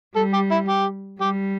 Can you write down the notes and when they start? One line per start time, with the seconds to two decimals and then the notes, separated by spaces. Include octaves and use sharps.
0.16 G3 A4
0.33 G4
0.51 E4
0.69 G4
1.20 G3 G4